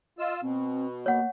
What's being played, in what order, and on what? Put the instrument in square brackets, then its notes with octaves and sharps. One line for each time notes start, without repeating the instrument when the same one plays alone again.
[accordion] F4 E6 [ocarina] D#5
[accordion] B2 [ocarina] C4
[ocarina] A#3 [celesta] C#5 F#5